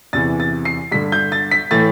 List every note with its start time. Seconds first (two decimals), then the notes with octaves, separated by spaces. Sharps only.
0.13 E2 C3 E3 A6
0.40 A6
0.65 C7
0.92 G2 D3 B6
1.12 G6
1.32 A6
1.51 B6
1.71 A2 E3 A6